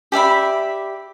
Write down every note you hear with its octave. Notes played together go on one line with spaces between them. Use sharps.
G4 D5 E5 B5